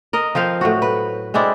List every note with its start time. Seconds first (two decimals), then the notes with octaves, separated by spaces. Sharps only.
0.13 A#4 D#5
0.35 F3 C4 C5 F5
0.61 A2 F#3 F#4
0.82 B4
1.34 G#3 C4 D4 E4